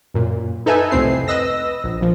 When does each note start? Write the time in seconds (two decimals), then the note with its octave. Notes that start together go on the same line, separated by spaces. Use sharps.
0.14 F#2 A#2
0.66 D#4 A4 B4 E5 G#5
0.91 C2 F2 A2 C4 C7
1.28 B4 D#5 E6 A#6
1.84 A#1
2.01 A#1 F3